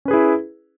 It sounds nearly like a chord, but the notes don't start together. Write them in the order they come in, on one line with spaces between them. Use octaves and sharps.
C#4 B4 G#4 E4